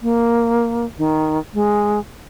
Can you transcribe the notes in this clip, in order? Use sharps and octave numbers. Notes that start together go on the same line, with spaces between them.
A#3
D#3
G#3